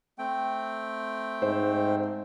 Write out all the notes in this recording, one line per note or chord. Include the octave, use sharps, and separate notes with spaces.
A3 C4 G5
G#2 C5